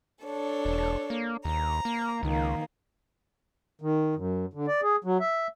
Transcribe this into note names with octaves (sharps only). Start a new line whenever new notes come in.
D4 A4 C#5
E1
A#3
D#2 A#5
A#3
C#2 D#3 A#3
D#3
F#2
D3
D5
G#4
F#3
E5